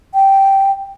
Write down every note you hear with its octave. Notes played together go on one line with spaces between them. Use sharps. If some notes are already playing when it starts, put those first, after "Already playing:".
G5